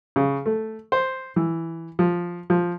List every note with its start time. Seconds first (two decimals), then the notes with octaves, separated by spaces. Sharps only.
0.16 C#3
0.46 A3
0.92 C5
1.36 E3
1.99 F3
2.50 F3